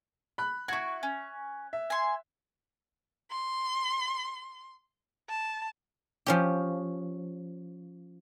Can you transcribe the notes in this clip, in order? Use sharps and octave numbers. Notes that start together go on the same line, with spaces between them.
B5 F#6
E4 F#4 C#6 G#6
C#4
E5
G#5 C6
C6
A5
F3 C#4 G4